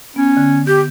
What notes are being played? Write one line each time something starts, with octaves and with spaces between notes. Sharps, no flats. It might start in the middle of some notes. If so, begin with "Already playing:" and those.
B3 C#4
D3
G4 G6